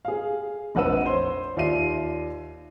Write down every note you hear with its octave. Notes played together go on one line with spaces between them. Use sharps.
G#4 F5
F1 A#1 B4 F#5 E6 D#7
C5 C#5 C6
D#2 F4 D5 E5 C7 D#7